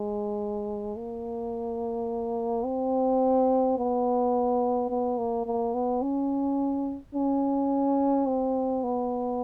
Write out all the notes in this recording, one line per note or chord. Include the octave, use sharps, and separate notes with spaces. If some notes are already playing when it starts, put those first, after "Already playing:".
Already playing: G#3
A#3
C4
B3
B3
A#3
A#3
B3
C#4
C#4
C4
B3